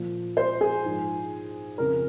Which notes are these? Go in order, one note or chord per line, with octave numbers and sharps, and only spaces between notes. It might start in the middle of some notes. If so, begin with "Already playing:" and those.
Already playing: A#2 F3
C5
G#4
G#2 F3
F2 C#3 F3 A#4